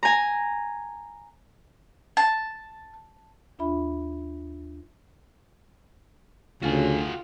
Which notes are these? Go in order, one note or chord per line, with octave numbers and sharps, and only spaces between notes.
G#5 A#5
A5
D#2 D4 F4 E5 B5
D2 C#3 F4 F#4 G#4